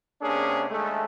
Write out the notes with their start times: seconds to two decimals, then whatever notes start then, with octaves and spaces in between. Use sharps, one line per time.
0.21 C3 A#3 C#4 D4 G#4
0.70 D#2 G#3 A3